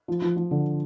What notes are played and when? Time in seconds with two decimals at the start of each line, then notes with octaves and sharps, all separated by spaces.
0.08 F3
0.22 F3
0.36 F3
0.51 D3